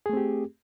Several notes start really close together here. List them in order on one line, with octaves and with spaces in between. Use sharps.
G#4 A3 C4 G4